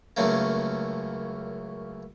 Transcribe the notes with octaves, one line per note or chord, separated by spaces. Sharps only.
C#2 F#2 C#3 A3 A#3